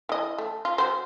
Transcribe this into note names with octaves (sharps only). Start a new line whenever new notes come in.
E3 D#5
A3
F4
F#3 C5